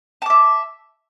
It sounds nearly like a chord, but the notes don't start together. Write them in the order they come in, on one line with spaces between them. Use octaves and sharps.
A5 D6 E5